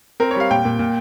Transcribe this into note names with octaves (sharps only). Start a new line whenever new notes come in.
C4 A#4
C#5
G3 F5
A#2 G5
A#2
A#2